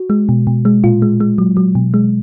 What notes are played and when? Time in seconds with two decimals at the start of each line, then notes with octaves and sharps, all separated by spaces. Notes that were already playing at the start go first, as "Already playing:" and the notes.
Already playing: F#4
0.10 G#3
0.29 B2
0.47 B2
0.65 G#3
0.84 A#2 F4
1.02 G#3
1.20 G#3
1.38 F#3
1.57 F#3
1.75 B2
1.94 G#3